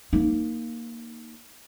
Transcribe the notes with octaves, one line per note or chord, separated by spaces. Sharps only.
A#3 D#4